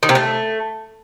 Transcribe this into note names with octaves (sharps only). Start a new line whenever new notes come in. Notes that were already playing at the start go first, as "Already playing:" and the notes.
D#3
C3
A3